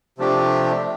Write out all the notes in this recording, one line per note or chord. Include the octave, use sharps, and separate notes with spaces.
C3 F3 A3 D4 G4